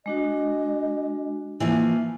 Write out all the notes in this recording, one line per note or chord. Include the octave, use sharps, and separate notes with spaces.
G#3 D4 F#4 D#5
E3 F3 A#3 F4